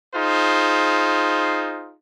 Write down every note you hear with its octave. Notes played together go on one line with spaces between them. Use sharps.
D#4 F4 G#4 C5